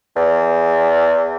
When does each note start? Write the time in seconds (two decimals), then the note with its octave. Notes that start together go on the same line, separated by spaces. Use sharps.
0.16 E2